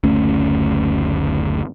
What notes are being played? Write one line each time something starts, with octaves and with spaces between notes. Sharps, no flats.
F#1 D2 A3 C#4